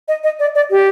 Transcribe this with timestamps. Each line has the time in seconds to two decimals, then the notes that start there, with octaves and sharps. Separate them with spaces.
0.08 D#5
0.24 D#5
0.39 D5
0.55 D5
0.71 G4